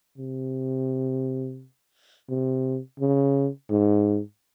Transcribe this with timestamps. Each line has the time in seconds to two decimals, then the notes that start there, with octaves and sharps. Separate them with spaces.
0.18 C3
2.29 C3
3.00 C#3
3.70 G#2